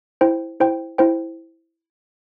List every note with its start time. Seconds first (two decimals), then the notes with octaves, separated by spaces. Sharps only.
0.21 E4 C5 G5
0.60 E4 C5 G5
0.98 E4 C5 G5